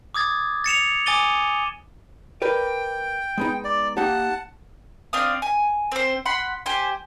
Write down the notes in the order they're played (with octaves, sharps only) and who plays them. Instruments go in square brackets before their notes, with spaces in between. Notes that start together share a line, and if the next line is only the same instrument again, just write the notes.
[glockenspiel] D6 D#6 G#6 A6
A6 C#7 E7 F7
G#5 D6 D#6 A6 D#7 G7
[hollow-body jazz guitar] A#4 B4 D5 [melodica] G5
[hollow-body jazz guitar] G#3 B3 D#4
[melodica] D5
[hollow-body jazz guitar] A#3 D#4 G4 [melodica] F#5 A5
[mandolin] C4 D4 F5 D#6
G#5
C4 C5
F#5 B5 C6
G4 C5 G#5